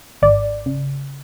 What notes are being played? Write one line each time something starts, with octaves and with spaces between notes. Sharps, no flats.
G#1 D5
C#3